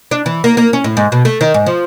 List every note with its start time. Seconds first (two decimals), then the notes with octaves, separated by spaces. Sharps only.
0.11 D4
0.26 E3
0.44 A#3
0.57 A#3
0.73 C#4
0.84 A2
0.97 G#2
1.12 B2
1.25 A3
1.41 D#3
1.54 G#2
1.66 F3